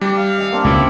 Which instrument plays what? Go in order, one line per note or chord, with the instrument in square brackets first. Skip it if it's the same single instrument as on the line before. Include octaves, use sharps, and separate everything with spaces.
[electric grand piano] G3 [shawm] D4 [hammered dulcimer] E5 A5
[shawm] F5
[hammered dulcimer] D#5 E5 G#5
A#3 C4 D4
[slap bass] C#2 C#3 [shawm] E4 [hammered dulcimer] G#5